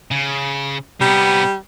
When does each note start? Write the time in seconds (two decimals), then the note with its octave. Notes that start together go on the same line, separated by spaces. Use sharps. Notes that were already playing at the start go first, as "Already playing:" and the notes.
0.11 C#3
1.01 C3 G3 B3